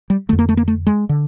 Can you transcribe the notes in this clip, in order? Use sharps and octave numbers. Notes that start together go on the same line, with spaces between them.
G3
F2 D3 A3
A#3
A3
A#3
A3
G#3
D3